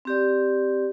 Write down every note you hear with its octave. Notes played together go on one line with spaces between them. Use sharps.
C4 G4 D5